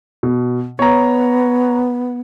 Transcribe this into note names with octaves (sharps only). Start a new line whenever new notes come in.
B2
B3 C#5 A#5